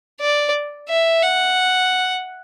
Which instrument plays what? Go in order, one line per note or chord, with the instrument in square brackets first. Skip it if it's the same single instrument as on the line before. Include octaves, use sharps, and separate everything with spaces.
[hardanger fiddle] D5
E5
F#5